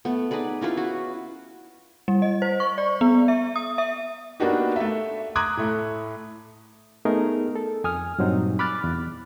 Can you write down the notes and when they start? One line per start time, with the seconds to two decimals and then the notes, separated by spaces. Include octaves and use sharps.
0.05 A3 B3
0.31 D#4 G#4 B4 D5
0.61 C#4 E4 F4 B4
0.77 F#4
2.08 G3
2.22 D#5
2.42 C5
2.60 C#6
2.78 D5
3.01 B3
3.28 E5
3.56 D#6
3.78 E5
4.40 A#3 B3 D4 D#4 F#4 G4
4.76 A3 E5
5.35 A#5 D6 D#6 F#6 G#6
5.57 A2 A3
7.05 A3 B3 D#4 G#4 A#4
7.56 A4
7.84 F2 G#5 D#6 F6
8.18 G2 A#2 F#3 C4 D#4
8.59 B5 D6 F6 F#6 A6
8.84 E2